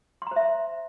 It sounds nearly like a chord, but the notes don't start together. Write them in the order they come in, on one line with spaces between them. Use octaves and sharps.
C6 A#5 C5 E5